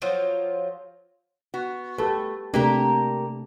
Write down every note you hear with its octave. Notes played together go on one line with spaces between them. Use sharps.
F3 F#3 F4
B3 F#4
A3 G4 A4 B4
C3 A3 A#3 D4 G4 A#4